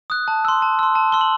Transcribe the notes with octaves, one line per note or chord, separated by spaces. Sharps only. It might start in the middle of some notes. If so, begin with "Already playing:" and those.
D#6 F#6
A5
C6 E6
A5
C6 E6
A5
C6 E6 G7
F#7